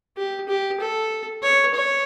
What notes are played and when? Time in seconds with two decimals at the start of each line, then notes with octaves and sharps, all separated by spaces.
0.17 G4
0.49 G4
0.80 A4
1.42 C#5
1.74 C#5